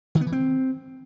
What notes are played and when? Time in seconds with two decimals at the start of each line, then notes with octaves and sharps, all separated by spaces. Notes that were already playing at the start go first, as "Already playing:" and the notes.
0.15 D#3
0.21 B3
0.27 E3
0.32 C4